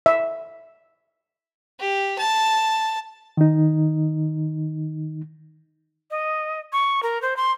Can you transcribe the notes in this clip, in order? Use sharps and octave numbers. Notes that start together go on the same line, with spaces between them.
E5
G4
A5
D#3 D#4
D#5
C#6
A#4
C5
C6